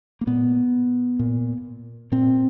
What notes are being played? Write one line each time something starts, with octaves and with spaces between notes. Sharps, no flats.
A#3
A#2 B3
A#2
A#2 C4